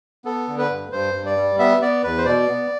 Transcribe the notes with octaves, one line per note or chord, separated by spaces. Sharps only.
B3 A4
D3
B4
G2
G2 C5
G2
D5
G3
B3 E5
B3 D5
E2 B4
C5
B2 D5
B3